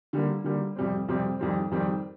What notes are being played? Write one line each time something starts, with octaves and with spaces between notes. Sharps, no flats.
D3 G3 A#3
D3 G3 A#3
F2 C3 G3 C4
F2 C3 G3 C4
F2 D#3 G3 C4
F2 D#3 G3 C4